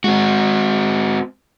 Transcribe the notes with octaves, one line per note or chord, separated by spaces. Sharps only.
G#3 C4 F#4